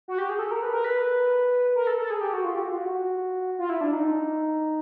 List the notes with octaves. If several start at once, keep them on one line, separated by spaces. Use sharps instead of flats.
F#4
G4
G#4
A4
A#4
B4
A#4
B4
A#4
A4
A4
G#4
G4
F#4
F4
G4
F#4
F4
F#4
F4
E4
D4
D#4